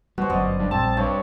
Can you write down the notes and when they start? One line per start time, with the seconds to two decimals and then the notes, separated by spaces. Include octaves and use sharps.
0.18 B2 G3 F#4 C5
0.30 G1 F#2 D5 D#5 F5
0.59 G2
0.71 A#1 G3 C4 A5
0.97 G2 C#5